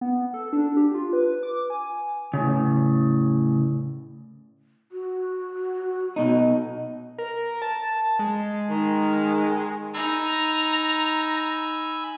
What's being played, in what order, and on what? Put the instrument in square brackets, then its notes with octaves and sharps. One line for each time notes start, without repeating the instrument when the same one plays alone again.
[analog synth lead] B3
A4
D4
G4
F4
B4
D6
G#5
[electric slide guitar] A2 C#3
[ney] F#4
[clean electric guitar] B2 D#4
[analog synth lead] A#4
A5
G#3
[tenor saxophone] D#3
[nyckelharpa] D#4 [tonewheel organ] G#5 B5 E6 [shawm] A#5